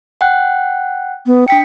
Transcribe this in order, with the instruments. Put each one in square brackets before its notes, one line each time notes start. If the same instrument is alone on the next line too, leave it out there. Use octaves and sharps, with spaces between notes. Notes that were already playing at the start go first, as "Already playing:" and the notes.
[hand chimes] F#5 G5 F#6
[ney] B3
[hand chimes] D4 B6 C#7 [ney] G5